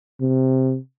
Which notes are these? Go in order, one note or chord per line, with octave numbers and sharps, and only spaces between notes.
C3